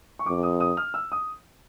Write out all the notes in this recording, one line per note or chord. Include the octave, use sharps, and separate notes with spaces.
C#6
F2 D6
D#6
D#6
F6
E6
D#6